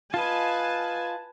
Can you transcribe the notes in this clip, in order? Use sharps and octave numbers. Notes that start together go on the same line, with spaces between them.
F4 B4 D#5 G#5 A5